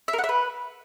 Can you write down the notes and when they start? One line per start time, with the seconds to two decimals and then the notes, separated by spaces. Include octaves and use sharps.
0.08 E5
0.13 A#4
0.18 F#5
0.24 E5
0.29 B4